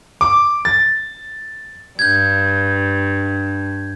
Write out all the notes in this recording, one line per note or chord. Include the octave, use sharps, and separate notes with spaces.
D6
A6
G2 G6 G#6